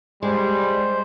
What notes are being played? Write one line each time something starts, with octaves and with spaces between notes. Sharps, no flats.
G3 G#3 C5